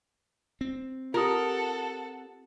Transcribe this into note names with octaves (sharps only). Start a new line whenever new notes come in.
C4
F4 G4 A4 A#4 F#5 D#6